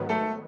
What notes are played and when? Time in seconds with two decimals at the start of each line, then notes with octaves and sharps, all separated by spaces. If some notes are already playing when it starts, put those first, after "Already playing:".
Already playing: G#2 D#3 F#3 B3
0.09 A3 A4